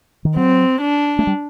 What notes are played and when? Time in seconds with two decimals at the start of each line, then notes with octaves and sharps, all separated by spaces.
0.25 D#3
0.36 F#3 C4
0.81 D4
1.19 A3
1.27 G3